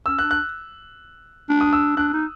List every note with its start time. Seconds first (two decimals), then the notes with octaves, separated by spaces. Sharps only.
0.06 C#4 E6
0.19 F#6
0.22 D4
0.31 F#6
1.49 D4
1.61 D#6
1.73 E6
1.97 D4 F#6
2.13 D#4